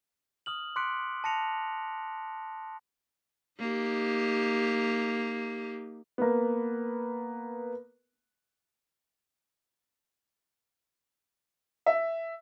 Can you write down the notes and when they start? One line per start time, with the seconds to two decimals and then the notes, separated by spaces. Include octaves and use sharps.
0.46 D#6 F6 F#7
0.76 C6 D6 F#6 B6 C#7 D7
1.24 A5 A#6 C#7 F7
3.60 A#3 D#4 G4
6.18 A#3 B3
11.86 E5